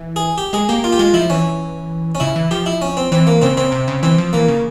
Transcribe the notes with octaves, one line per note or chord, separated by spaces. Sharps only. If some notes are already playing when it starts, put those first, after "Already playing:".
Already playing: E3
G#4
G4
G#3 G#4
A#3 G4
F4
G4
G#3 F4
F3 E4
E3 C#4
C#4
C#3 E4
E3
F3 G4
E4
C#4
C4
E3 C4
A#3
C#3 C4
C#3 C4
C3
C#3
E3 C4
F3
E3 A#3
C#3